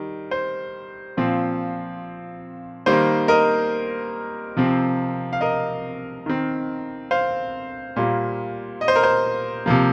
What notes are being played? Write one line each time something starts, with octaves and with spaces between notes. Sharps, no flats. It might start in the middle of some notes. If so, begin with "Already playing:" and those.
Already playing: D#3 G3
C5
A#2 F3 C4
D#3 G3 A#3 C5
A#4 D#5
C3 F3 C4
F5
A#4 D#5
D#3 C4
C5 F5
A#2 G3 A#3
D#5
C5
A#4
C5
C3 F3 A#3